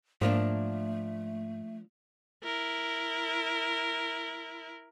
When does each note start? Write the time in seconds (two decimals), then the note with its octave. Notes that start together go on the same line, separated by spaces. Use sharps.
0.21 G#2 F3 A3 A#3 D4
2.44 E4 A#4